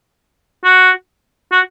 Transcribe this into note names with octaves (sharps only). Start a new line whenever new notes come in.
F#4
F#4